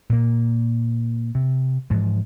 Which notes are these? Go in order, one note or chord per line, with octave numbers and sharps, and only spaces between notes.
A#2 A#3
C3
G#2 E3 F3